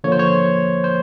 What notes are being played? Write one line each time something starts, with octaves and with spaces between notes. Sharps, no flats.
D3 F3 A#3 C#5
C5
C#5
C5